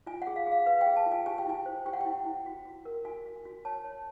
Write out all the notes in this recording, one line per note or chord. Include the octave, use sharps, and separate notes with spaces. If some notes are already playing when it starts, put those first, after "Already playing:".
F4 G#5
F#5
G#4
F5
G#4
F5
B4 F5
G5
G#4
A5
F4
G#5
G4 G#5
G5
E4 G#5
C5
G4 G5
F#5
E4 G5
E4
F#4
F#4
A#4
F#4 G#5
F#4
F#4
C#5 A5
C#5